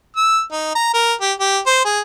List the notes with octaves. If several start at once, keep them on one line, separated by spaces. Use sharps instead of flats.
E6
D#4
A#5
A#4
G4
G4
C5
G#4